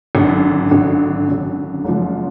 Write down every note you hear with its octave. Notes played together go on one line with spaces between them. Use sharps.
G#1 F#2 D3
G#1 F#2 D3
G#1 F#2 D3
F#1 F#2 F3 G#3